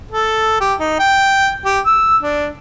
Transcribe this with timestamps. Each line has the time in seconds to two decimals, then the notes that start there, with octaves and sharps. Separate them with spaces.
0.11 A4
0.61 G4
0.80 D#4
0.99 G5
1.65 G4
1.86 E6
2.23 D4